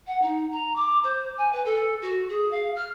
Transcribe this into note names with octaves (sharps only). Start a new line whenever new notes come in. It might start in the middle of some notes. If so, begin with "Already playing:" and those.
F#5
D#4
A#5
D6
C5
G#5
B4
A4
F#4
G#4
F5
F6